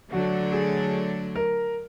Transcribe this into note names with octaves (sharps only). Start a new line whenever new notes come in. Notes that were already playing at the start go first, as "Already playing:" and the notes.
D3 F#3 A3 D4 F#4
G#4
A#4